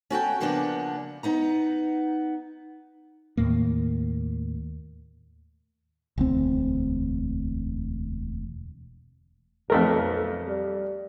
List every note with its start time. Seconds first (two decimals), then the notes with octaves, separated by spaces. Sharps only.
0.10 C#4 F#4 A4 G5
0.40 C#3 F3 A#3 B3 D4
1.23 B3 D#4 A#5
3.37 D#2 A2 A#3
6.18 E1 D2 C4
9.70 B1 F2 A3 A#4
10.47 G3